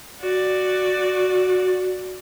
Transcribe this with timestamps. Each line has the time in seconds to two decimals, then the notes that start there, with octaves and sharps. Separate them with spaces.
0.21 F#4 D5